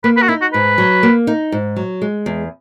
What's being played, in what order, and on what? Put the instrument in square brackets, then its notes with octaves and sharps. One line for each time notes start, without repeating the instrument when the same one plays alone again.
[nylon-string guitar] A#3 [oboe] B4
[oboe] B4
F#4
[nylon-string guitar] D#4 [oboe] E4
[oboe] F#4
[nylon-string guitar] G#2 [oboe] B4
[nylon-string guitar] F#3
A#3
D#4
G#2
F#3
G#3
E2